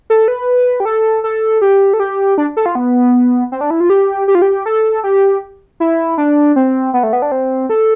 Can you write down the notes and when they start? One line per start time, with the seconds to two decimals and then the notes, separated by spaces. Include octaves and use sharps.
0.10 A4
0.28 B4
0.80 G4
0.85 A4
1.24 A4
1.62 G4
1.94 A4
2.00 G4
2.38 D4
2.57 A4
2.66 F4
2.75 B3
3.52 C4
3.61 D4
3.71 E4
3.80 F4
3.90 G4
4.28 G4
4.35 F4
4.42 G4
4.66 A4
5.04 G4
5.80 E4
6.18 D4
6.56 C4
6.94 B3
7.03 A3
7.13 B3
7.22 D4
7.32 C4
7.70 A4